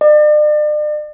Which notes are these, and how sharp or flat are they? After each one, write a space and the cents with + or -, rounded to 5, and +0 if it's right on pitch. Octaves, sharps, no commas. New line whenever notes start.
D5 +40